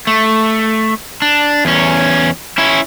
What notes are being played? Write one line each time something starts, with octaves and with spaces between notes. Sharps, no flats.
A3
D4
E2 C#4
C#4 E4